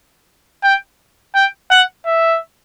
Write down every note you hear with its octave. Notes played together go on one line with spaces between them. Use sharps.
G5
G5
F#5
E5